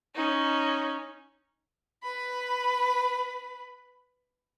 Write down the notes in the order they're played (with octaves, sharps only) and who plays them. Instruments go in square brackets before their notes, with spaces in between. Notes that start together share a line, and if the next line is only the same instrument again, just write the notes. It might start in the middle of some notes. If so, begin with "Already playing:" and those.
[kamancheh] C#4 D#4
[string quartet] B4 B5